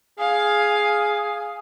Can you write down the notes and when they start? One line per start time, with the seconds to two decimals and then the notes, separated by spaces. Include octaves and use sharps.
0.19 G#4 F5